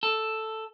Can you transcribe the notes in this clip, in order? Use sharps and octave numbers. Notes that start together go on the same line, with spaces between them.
A4